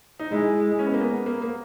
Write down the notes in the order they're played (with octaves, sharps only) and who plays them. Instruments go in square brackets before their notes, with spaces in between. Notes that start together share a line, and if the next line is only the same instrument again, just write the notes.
[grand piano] D#4
[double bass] G#3 [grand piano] E4
[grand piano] C#4
B3
A#3
B3
A#3
A#3